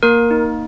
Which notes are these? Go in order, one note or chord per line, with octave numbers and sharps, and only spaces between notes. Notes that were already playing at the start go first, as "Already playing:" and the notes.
A#3 A#4
D#4